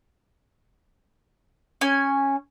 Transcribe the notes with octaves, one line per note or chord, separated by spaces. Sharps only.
C#4 G#5